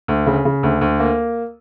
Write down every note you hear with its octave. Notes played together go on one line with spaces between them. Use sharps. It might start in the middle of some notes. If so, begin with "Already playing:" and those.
D2
C#3
C#3
D2
D2
A#3